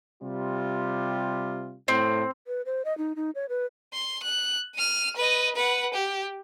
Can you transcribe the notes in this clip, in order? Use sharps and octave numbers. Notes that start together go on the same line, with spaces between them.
C3 G3 F4
A2 C4
B4
C5
D#5
D#4
D#4
C#5
B4
C6
F#6
F6 D#7
B4 D#5
B4 F#5
G4